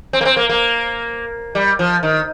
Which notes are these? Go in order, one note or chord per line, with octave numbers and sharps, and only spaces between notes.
C4
A#3
C4
A#3
A#3
G3
F3
D#3